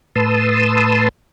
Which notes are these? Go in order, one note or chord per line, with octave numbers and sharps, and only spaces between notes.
A2 B4 A5 C6 D#6 E6